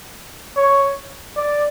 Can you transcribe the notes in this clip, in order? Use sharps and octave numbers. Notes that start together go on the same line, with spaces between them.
C#5
D5